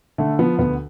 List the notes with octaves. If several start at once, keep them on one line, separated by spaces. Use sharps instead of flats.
D3 A3
F3 B3
D2 B3